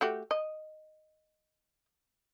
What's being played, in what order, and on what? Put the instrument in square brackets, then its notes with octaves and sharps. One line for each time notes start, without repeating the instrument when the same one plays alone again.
[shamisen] A3 F#4 G4
D#5